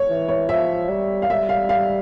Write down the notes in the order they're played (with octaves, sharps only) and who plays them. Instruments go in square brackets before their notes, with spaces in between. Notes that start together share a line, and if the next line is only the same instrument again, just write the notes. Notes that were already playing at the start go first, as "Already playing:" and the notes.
Already playing: [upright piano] C#5
[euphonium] E3
[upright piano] C#5
[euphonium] F3 [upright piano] E5
[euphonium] G3
[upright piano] F5
[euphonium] G3 [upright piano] E5
[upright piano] F5
F5